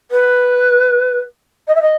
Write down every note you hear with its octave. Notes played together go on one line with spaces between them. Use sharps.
B4
D#5
E5
D#5